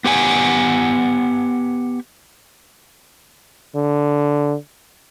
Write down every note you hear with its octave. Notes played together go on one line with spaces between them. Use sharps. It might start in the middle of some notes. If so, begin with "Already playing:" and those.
B3 G4 F#5 G#5
D3